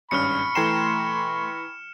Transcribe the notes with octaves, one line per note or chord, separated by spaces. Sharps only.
G#1 G2 C#4 B5 C#6 F6 C#7
E3 A3 G5 A#5 C6 E7